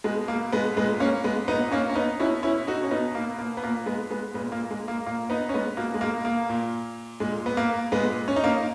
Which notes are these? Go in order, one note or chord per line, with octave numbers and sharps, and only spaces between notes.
B2 G#3
A#3
G#3 B3
A#2 G#3 B3
A#3 C#4
G#3 B3
A#2 B3 D#4
A#3 C#4
C#4
B3 D#4
B2 C#4 E4
C#4 E4
D#4 F#4
C#4
B2 B3 D#4
A#3
A#3
B3
A#2 A#3
G#3 B3
G#3 B3
A#2 G#3 B3
A#3
G#3
A#3
A#2 A#3
B3 D#4
C#4
G#3 B3
B2 A#3
G#3
A#3
A#3
A#2
A#2 G#3
B3
A#3
A#2 G#3 B3
C#4
D#4
A#3 C#4